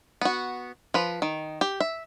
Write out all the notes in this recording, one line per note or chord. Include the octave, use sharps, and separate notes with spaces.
B3 F#4
F3 B4
D#3
G4
E5